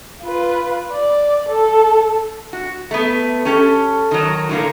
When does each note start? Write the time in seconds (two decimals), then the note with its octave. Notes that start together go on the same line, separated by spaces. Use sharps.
0.23 F4 B4
0.92 D5
1.49 A4
2.53 F#4
2.91 A3 B3
3.45 C#4 G4 A4
4.11 D#3 F#3
4.49 A2 D3 A#3